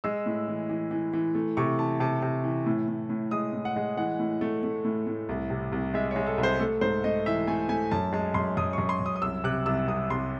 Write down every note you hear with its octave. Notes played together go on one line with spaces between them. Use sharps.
G#3 E6
A2
E3
E3
E3
E3
A3
C3 C#6
E3 A5
C3 A5
C3
E3
A2
A2
A2
G#3 D#6
A2
F#5
G#3
E3 F#5
A2
A3
A3
A2
A2
C2
C3
C2
G#3 E5
C#5
G#3
A4
C2
C5
A3 A4
G#2 C5
A3 D#5
E3 E5
A3 G#5
A3 G#5
F#2 A5
G#3 A5
F#2 C6
F#2 D#6
F#2 C#6
C6
F#2
D#6
D#6
C2 E6
C3 F#6
C2 E6
C2 D#6
C2 C6